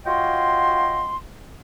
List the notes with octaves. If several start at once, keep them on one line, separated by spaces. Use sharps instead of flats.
F4 F#4 C#5 D#5 G5 C6